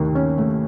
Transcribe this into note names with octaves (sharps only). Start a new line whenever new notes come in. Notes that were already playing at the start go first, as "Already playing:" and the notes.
Already playing: D#2 D#3 A3
C#4
A3